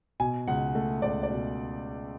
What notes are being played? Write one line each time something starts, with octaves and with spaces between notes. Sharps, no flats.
B2 G#5
C#2 F#5
A3
C#2 D5
D5
B2